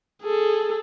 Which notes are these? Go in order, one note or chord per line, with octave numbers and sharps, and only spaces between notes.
G#4 A4